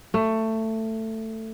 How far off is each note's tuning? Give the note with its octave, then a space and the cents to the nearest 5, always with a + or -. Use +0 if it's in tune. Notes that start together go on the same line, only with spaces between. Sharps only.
A3 +15